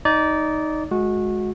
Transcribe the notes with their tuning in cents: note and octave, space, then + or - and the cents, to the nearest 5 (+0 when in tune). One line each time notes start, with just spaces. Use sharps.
D#4 +0 D5 -20
G#3 +20 F#4 -20